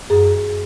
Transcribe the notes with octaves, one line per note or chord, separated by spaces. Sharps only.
F#2 G#4